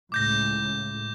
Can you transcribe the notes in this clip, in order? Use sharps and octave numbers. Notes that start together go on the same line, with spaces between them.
C#2 A2 C#3 D6 G6 A#6